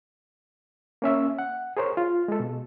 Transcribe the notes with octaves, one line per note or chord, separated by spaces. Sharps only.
A#3 C#4 E5
F#5
G#4 A#4 C5 C#5
F4
G#3 A4
B2